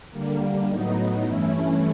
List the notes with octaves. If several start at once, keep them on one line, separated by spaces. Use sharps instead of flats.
D3 G3 A#3
A2 F#3 B3 D#4
G2 E3 A3 C#4 E4